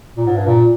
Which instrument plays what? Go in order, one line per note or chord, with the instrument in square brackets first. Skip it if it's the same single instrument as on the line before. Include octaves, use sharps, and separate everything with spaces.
[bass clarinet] A#2
G#2
G2
A#2